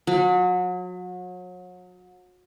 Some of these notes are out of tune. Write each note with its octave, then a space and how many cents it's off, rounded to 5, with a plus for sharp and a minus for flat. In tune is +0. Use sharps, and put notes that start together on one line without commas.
F#3 -35